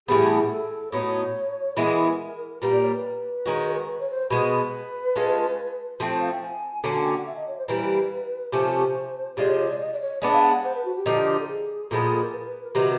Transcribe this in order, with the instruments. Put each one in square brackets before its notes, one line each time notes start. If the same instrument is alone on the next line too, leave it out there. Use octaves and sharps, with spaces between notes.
[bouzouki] A2 E3 G3 B3 [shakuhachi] G#4
[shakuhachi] A4
[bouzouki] A2 F#3 B3 D#4 [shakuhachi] C#5
[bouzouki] E3 G#3 B3 E4 [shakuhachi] A#4
[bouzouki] A#2 G3 A#3 [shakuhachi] B4
[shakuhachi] D5
C#5
B4
[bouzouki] D#3 G#3 C#4 F#4
[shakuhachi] B4
C#5
C5
[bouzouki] B2 G#3 B3 [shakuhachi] B4
[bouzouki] G#3 C#4 F4 A4
F3 A3 C4
[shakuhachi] C5
F5
G5
G#5
[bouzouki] D3 F#3 A#3 C#4 [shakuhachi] G#5
[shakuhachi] G#5
G5
F#5
E5
D#5
C#5
C5
[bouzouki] E3 G3 A#3 [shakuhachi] B4
[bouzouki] C3 F3 A3 C#4 [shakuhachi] C5
[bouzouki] C3 F3 G#3 [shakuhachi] D5
[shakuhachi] C#5
C#5
D5
D#5
D5
C#5
[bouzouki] G#3 B3 D4 [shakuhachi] D5
[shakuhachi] F5
F#5
F#5
C5
B4
F#4
G4
[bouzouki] D3 F3 A#3 D#4
[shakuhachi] A4
G#4
[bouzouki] A#2 F3 G#3 B3 [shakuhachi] A4
[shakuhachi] G#4
A4
A#4
B4
A#4
B4
A#4
[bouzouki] C3 D#3 F#3 [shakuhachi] B4